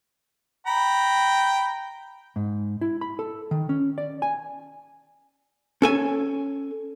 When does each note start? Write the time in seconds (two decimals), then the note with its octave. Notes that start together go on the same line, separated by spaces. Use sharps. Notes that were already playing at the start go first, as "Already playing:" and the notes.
0.67 G5 A#5 B5
2.36 G#2
2.81 E4
3.01 B5
3.19 A4
3.51 D#3
3.69 C#4
3.98 D5
4.22 G#5
5.82 C#4 A4 G#5